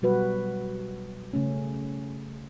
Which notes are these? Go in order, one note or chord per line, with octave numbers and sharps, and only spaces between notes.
B2 F#3 G3 F#4 B4
C#3 A3 C#4